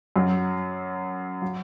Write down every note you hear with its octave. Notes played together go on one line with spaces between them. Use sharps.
F#2 F#3
F#3